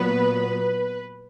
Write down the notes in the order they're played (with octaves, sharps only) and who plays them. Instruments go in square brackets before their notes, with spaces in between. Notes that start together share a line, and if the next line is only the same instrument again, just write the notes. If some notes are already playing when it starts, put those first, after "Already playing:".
Already playing: [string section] A#2 F#3 B3 B4